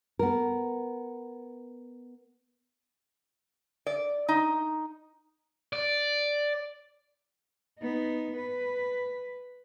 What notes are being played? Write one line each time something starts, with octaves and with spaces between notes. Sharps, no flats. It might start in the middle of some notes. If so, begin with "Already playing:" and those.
B3 A#4
D5
D#4
D5
B3 D#4
B4